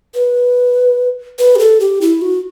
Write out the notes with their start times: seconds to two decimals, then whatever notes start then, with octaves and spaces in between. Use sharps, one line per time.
0.14 B4
1.39 B4
1.56 G4
1.59 A4
1.80 G4
2.01 E4
2.22 F#4